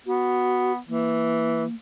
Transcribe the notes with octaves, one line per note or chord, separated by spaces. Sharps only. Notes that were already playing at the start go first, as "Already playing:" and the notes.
B3 F#4
E3 A#3